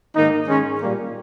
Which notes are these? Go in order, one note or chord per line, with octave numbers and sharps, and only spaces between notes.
G#2 D#3 A#3 D#4
G#2 D#3 G#3 C#4
A#2 G3 A#3